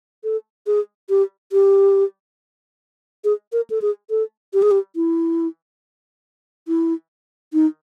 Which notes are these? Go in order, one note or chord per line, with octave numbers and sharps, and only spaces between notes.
A4
G#4
G4
G4
G#4
A#4
A4
G#4
A4
G4
G#4
G4
E4
E4
D#4